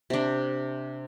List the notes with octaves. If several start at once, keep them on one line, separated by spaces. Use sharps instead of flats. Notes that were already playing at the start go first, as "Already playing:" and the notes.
C3 D4